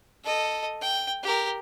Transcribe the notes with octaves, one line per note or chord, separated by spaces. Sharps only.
A4 D#5
G5
G4 A#4